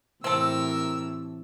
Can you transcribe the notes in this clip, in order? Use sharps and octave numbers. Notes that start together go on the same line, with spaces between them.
A2 C3 E3 C4 A4 A#4 E6